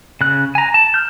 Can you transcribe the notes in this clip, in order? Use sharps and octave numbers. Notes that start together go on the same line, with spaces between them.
C#3 F#6
G#5 A#5
A5
F6 G6